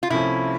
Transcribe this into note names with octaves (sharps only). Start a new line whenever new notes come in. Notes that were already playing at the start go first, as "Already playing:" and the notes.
F4
C2 C3 F3 A3 C#4 E4